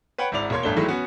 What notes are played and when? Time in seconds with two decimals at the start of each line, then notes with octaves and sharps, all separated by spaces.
0.18 B4 C#5 F#5 G5
0.32 G#1 G#2 E4 D5 F7
0.50 E1 A#3 C#5 C6 G#6
0.63 A1 G2 A3 D4 G7
0.76 A2 D#3 E3 F#3 G#3 A3
0.88 B3 C#4 F#4